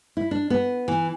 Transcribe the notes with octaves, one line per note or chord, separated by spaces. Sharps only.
E4
D4
B3
E3